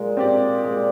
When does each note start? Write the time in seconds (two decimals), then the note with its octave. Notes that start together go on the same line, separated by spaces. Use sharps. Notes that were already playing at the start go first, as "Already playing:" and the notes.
Already playing: A#2 G#3
0.17 C4 G4 D5
0.65 G#3